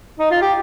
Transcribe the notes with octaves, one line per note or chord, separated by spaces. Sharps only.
D#4
F4
G4